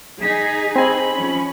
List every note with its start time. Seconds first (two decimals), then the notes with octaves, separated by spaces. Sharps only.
0.21 D#4 G#4 B6
0.76 C4 G#5 B5
1.16 F3 C#4